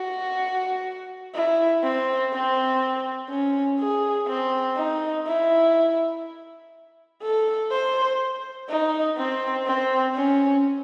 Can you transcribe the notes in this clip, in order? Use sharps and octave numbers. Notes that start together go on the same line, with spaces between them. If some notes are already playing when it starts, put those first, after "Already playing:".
Already playing: F#4
E4
C4
C4
C#4
G#4
C4
D#4
E4
A4
C5
D#4
C4
C4
C#4